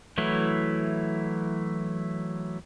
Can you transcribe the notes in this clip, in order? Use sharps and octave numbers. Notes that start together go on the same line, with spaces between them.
E3 F#3 A3 E4